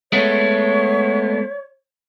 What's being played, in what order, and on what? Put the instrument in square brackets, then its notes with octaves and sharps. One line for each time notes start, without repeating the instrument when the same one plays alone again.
[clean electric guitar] G#3 A3 B3 [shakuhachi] C#5